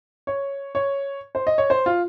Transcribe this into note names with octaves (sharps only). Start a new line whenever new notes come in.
C#5
C#5
C5
D#5
C#5
C5
F4